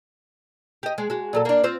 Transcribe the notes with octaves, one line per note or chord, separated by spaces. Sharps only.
G4 D#5
G#3
G#3 F#4
A#2 F#3 A4
A#3 D4
C4 F4 C5